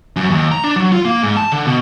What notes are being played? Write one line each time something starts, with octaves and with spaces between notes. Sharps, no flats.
F#2
D#2
A#5
D4
F#3
F4
A#3
G#2
A5
D3
B2